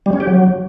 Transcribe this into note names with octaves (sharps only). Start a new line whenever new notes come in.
G3
C#4
G4
F#3